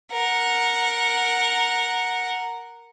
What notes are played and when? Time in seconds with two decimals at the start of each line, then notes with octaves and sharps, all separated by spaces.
0.12 A#4 F#5